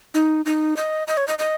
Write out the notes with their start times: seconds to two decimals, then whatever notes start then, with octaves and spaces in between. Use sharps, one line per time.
0.14 D#4
0.46 D#4
0.77 D#5
1.07 D#5
1.17 C#5
1.28 D#5
1.39 D#5